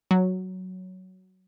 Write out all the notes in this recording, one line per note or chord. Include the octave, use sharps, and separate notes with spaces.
F#3